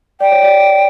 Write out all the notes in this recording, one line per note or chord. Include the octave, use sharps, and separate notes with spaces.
D5 G5
C#5
D5